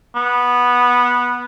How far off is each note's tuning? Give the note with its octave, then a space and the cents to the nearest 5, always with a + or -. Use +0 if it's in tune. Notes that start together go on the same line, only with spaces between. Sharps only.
B3 -10